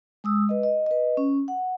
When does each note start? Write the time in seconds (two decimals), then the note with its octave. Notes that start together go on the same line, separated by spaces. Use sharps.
0.24 G#3 D#6 E6
0.49 B4 D#5
0.63 D#5
0.86 B4 D#5
1.17 C#4
1.48 F#5